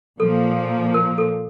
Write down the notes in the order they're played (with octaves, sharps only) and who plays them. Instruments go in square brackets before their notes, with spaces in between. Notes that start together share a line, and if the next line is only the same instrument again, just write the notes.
[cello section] A#2 F3 A#3 [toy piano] A4
[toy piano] A#4
A4